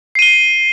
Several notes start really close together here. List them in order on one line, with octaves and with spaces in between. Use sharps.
C7 D#7 G7